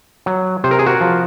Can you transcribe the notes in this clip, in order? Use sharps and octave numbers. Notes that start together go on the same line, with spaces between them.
F#3
C3 C5
A#4
G#4
F#4 A#4
F3